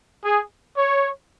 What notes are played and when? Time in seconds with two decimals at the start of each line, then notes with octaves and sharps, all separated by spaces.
0.25 G#4
0.77 C#5